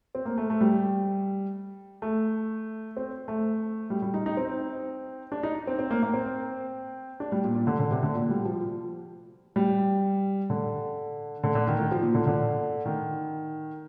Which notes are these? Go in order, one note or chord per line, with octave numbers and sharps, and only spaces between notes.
C4
A#3
A3
A3
G3
A3
C4
A3
G3
G3
D#4
D#4
C4
D4
D#4
C4
C4
A#3
A#3
C4
D4
G3
A#2
A#2
D3
D3
C3
D3
A#2
G3
F3
G3
D3
D3
D3
D#3
D#3
F3
A#2
D3
D3
D#3